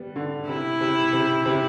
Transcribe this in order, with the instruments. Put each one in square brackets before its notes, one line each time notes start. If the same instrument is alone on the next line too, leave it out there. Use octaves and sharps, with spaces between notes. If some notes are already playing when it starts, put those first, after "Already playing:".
Already playing: [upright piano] G3 B3
D3
[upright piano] C3 [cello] E4
[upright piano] C3
C3
C3